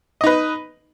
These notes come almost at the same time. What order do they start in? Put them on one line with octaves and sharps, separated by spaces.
D#5 D#4 B4